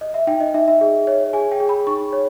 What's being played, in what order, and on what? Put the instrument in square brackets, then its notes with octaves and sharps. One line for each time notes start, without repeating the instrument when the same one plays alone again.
[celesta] D#5
E5
D#4 G5
D#5
D#4 E5
E5
G#4
C#5
G#4 G#5
G5
G#4
B5
D#4 C#6
C#5